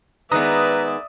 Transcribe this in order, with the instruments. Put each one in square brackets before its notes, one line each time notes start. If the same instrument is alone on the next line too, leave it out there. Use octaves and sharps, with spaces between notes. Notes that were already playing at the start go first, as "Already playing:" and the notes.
[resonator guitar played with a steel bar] D#3 G#3 B3 [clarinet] B4 [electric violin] D5 E5 [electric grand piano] A#5 D#6